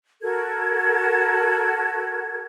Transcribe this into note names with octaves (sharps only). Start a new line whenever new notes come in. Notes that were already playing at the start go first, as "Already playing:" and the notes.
F#4 A4 A#4 G#6